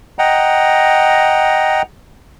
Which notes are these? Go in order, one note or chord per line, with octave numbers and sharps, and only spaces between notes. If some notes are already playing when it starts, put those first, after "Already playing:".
D#5 F#5 G5 A#5